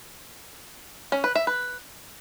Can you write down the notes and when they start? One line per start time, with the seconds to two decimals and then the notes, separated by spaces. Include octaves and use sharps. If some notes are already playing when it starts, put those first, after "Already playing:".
1.12 C#4
1.24 B4
1.35 E5
1.47 B4